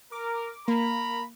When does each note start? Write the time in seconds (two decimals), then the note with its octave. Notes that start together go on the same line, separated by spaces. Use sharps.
0.12 A#4 D6
0.68 A#3 A#4 A#5 B5